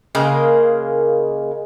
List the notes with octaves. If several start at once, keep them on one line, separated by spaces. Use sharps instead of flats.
C#3 G#3 A#3